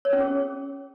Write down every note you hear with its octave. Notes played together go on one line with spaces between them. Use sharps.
C#5
C#4
G#4